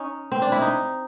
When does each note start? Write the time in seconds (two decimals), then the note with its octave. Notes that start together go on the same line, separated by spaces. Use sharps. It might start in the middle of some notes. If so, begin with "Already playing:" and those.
Already playing: C#4 D#4
0.32 C4
0.42 D4
0.52 E4
0.62 D#4